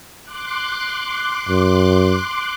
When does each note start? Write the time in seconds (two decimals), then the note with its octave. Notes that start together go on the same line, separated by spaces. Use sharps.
0.23 C6 D6 F#6
1.48 F#2